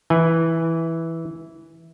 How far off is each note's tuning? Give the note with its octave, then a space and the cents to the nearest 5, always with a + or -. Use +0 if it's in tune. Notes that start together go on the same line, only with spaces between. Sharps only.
E3 -5 G#5 -10